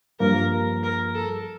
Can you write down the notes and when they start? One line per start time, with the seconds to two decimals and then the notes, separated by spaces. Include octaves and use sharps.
0.20 G2 F3 A#3 A#4
0.83 A#4
1.15 A4